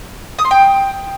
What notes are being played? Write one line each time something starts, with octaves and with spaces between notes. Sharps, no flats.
D#6
C6
G5